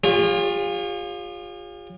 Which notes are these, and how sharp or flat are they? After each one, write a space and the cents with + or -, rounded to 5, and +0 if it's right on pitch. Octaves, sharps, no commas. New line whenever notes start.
F4 +20 G#4 -45 C#5 +0